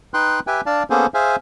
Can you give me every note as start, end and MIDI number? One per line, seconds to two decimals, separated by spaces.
0.14 0.40 63
0.14 0.40 71
0.14 0.40 79
0.14 0.40 84
0.14 0.40 90
0.47 0.61 67
0.47 0.61 71
0.47 0.61 76
0.47 0.61 79
0.47 0.61 80
0.66 0.83 62
0.66 0.83 74
0.66 0.83 77
0.66 0.83 81
0.90 1.06 58
0.90 1.06 59
0.90 1.06 61
0.90 1.06 68
0.90 1.06 69
0.90 1.06 72
1.14 1.36 68
1.14 1.36 72
1.14 1.36 76
1.14 1.36 77
1.14 1.36 80